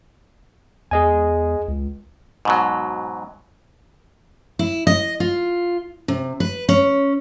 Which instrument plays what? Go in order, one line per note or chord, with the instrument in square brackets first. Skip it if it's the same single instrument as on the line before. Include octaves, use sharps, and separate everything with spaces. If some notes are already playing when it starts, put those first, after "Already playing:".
[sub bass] E2 [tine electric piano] G#4 D#5 G#5
[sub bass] C#2
[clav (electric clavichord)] G#2 B2 F#3
[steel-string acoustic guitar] E4
D#5
F4
C3
B4
C#4